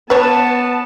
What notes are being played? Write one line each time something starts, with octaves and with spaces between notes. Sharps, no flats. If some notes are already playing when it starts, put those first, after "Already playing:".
B3 B4 C#5 A5